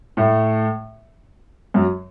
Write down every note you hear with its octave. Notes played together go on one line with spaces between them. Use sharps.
A2 A3
F#2 F#3